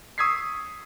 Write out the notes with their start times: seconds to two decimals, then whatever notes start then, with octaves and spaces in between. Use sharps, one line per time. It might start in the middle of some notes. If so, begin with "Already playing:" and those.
0.18 C#6 D#6 E6 G#6 B6 C7